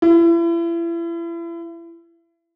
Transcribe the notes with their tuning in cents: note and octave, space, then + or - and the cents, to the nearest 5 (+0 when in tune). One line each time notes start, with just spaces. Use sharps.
E4 +35